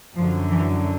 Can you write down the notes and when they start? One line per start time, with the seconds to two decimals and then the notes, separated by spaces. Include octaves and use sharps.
0.16 F#2 D3 F3
0.50 E3